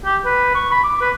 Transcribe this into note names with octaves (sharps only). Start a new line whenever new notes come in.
G4
B4
C#6
B5
D6
B4